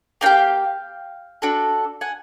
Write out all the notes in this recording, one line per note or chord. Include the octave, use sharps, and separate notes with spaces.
A#3 D#4 G4 F5 G5
D4 F#4 A4
F#5 G#5